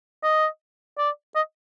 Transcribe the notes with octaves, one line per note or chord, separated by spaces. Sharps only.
D#5
D5
D#5